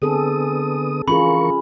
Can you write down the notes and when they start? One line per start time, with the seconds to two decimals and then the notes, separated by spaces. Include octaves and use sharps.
0.02 D3 B3 C4 G#4 A4 D#6
1.08 E3 C#4 F4 G#4 A#4 B5 C#6